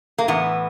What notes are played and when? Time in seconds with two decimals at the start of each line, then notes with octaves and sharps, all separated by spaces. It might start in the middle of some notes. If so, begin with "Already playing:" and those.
0.18 A#3
0.28 A2 E3 B3